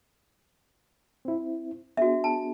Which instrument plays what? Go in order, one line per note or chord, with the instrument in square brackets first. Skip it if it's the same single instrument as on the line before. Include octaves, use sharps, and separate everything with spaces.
[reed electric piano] C4 E4
[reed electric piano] B3 D4 G#4 [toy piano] F#4 E5
[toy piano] A5